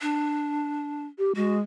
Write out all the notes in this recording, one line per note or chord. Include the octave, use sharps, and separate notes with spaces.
D4
G4
G#3 F#4